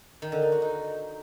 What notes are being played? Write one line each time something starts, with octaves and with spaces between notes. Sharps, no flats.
D#3
D3
D#4
F#4
D#4